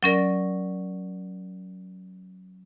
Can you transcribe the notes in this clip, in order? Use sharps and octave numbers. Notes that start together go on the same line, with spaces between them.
F#3 C#4 A#4 D5